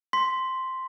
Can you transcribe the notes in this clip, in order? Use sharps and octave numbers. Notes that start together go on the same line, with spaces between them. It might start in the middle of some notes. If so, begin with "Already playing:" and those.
C6 B6